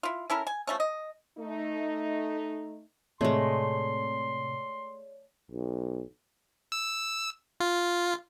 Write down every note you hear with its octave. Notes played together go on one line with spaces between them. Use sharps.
E4 F4
C#4 E4 A4 A#4
G#5
F3 A3 C#4
D#5
A3 D#4
A2 C3 G#3 A3 C#5 D5 C6
B1
E6
F4